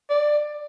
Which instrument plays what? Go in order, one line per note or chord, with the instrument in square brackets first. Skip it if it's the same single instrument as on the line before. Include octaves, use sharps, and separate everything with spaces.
[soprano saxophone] D5